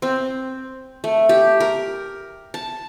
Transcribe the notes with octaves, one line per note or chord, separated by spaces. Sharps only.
C4
A3
G4
A#4
A5